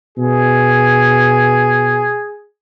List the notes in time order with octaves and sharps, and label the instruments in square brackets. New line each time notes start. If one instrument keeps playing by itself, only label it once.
[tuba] B2 [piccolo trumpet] G#4